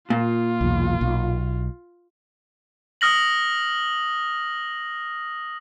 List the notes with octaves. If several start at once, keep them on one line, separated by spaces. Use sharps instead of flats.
A#2 F4
B1 E2
B1
D#6 F6 A#6 F#7